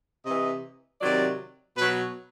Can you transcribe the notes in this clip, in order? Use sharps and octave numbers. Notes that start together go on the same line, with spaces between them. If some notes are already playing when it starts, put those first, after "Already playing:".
C3 E3 D#5
C3 D#3 F#3 D5
B2 F#3 B4